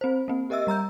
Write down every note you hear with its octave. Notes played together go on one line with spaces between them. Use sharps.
C4 C5
A#3 C4
G4 A#4 D#5 E5 E6
G3 A#5 E6 G6